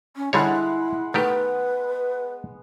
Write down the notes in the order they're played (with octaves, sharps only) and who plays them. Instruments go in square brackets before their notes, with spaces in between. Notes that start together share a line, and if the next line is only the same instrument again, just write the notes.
[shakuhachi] C#4
[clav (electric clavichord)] D3 G3 C#5 [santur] G#3 F#5 [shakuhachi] E4
[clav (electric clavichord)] D#3 A3 G4 [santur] B3 [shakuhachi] B4